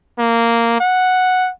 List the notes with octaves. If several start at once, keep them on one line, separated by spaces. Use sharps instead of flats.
A#3
F#5